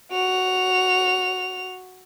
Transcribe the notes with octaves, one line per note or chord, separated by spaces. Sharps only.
F#4 F7